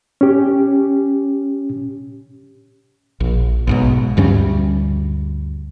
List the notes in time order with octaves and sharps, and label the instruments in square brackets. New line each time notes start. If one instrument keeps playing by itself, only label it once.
[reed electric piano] C#4 G4
[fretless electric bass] A#1
B1 G#2 B2
D2 G2 G3 C#4